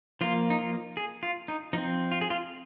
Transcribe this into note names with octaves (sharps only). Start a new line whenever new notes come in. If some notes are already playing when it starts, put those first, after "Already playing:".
F3 A#3 F4
D#4
F4
G#4
F4
D#4
F3 C4 D#4
F4
G#4
F4